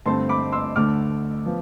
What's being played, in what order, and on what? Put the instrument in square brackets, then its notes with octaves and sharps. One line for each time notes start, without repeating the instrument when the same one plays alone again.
[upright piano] G2 D3 A3 C4 A5 C6
B5 D6
C6 E6
D2 D3 A3 D6 F6
F3 B3